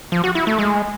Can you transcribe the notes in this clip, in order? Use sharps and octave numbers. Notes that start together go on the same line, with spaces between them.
F3
F#4
E4
A3
G#3